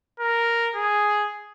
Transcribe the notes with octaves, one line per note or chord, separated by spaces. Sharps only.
A#4
G#4